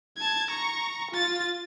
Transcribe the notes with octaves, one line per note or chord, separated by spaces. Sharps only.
A5 G#6
A#5 C#6
F4 A6